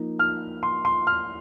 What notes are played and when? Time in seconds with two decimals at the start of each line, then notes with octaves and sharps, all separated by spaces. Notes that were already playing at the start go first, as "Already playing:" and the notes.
Already playing: F3 A#3 D#4
0.19 F6
0.63 C6
0.85 C6
1.07 F6